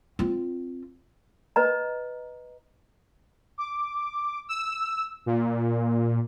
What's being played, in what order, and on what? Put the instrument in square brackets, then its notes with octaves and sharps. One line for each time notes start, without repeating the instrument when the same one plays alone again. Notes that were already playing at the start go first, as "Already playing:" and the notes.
[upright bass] C4 F4
[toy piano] B4 D#5 A#5
[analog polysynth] D6
E6
A#2